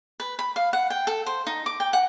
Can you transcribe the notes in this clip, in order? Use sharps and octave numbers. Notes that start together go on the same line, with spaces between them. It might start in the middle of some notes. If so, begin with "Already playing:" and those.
B4
B5
F5
F#5
G5
A4
C5
D#4
D6
G5
F#5